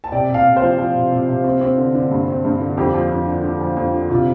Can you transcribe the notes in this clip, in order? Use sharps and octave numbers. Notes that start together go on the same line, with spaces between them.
A5
C3 D5 G5
C3
F5 A5
C3
C5 F5
F3
F3
C3
C3
C3
C4
C4
D3
D3
G2
C4
G2
D3
F2 G4
F3
F2
D3
D3
F3
F2
D3
C3 F4